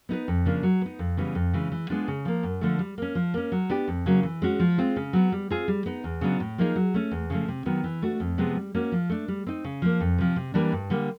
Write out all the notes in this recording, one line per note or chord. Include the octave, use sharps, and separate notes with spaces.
B3 D#4 G#4 B4
F2
C#3 F3 A#3 D4
F#3
B3 D#4
F2
C#3 E3 G3 B3
F2
C#3 E3 G#3
E3
G#3 B3 D4 F4
C#3
F3 A#3
F#2
D3 F3 A3
G3
A#3 C#4
F3
A#3 C#4
F#3
B3 D4 G4
F2
C#3 F#3 A#3
E3
G#3 C#4 F#4
F3
G#3 C4 F4
C#3
F#3 B3
G3
C4 F4 G#4
G3
B3 D#4
E2
C#3 F#3 B3 D4
A2
F3 A#3 D#4 G#4
F#3
A3 C#4
E2
C#3 F3 A3
C3
D#3 F#3 B3
E3
A3 D4 F#4
F2
C3 F3 G#3 B3
G3
A#3 C#4 F#4
F3
A3 D4
G3
C4 D#4
C#3
F3 A#3
F2
C3 F3
C3
E3 G3 A#3 D4
G2
D3 G3 A#3